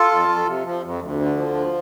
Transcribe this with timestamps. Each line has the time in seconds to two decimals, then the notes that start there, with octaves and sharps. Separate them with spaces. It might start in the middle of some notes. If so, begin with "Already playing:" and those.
Already playing: F4 A4
0.12 F2
0.29 F2
0.47 C3
0.65 F3
0.84 F2
1.01 D2
1.19 D3
1.37 F3
1.54 D2